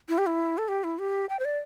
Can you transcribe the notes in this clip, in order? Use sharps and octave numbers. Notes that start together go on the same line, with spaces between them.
E4
G4
E4
A4
G4
E4
G4
G5
C5
D5